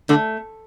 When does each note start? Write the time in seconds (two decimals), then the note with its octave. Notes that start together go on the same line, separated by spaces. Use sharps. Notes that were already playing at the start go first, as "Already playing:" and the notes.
0.09 D3 A3